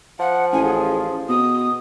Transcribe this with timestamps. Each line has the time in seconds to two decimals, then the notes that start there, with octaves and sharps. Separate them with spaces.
0.20 F3 F#5
0.53 A1 G#5
0.64 G#4
1.29 B2 D#6